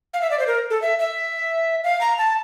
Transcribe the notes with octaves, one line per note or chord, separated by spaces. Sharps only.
F5
E5
D5
C5
A#4
A4
E5
E5
F5
A#5
A5